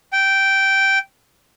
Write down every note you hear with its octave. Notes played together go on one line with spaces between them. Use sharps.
G5